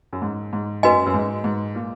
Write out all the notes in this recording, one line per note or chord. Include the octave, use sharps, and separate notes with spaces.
F#2
G#2
G#2
F#2 F#4 B4 D#5 G#5
F#2
G#2
G#2
A#2